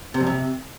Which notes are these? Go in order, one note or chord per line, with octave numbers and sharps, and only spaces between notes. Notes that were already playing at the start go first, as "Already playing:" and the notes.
C3
F2
C3